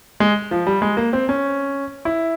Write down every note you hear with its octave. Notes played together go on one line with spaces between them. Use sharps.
G#3
F3
G3
G#3
A#3
C4
C#4
E4